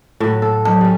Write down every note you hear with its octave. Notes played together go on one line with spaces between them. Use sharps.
A2 F#3
A4
F#3 A5
G3 C#4